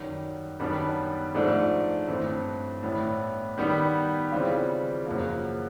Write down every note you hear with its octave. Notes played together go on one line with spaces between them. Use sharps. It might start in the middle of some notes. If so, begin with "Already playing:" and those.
Already playing: F#2 D#3 G3
F#2 D#3 G3 B3 D4
G#2 F3 A3 D4
G2 E3 A3 C4
A2 E3 G3 B3
D#3 G3 B3
C#3 E3 G3 C4 F4
F#2 C#3 F3 A#3